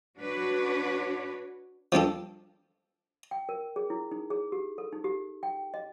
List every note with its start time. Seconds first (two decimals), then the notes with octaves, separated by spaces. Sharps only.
0.18 D4 F#4 B4 C#5
1.92 F3 G3 D4 A4
3.31 G5
3.49 A#4
3.76 G#4
3.90 E4
4.11 D#4
4.30 G#4
4.52 G4
4.78 A4
4.93 D#4
5.04 G4
5.43 G5
5.74 D#5